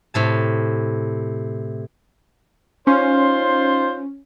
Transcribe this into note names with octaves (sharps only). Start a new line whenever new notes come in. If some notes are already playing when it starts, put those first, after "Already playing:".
A2 C3 A5
C#4 D#4 F4 C5